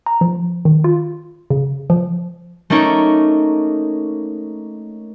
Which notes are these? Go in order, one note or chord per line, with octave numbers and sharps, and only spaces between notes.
A#5
F3
D#3
F4
C#3
F3
A3 A#3 C#4 D#4 A4 A#4